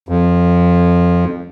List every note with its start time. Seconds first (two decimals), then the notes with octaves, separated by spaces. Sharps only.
0.09 F2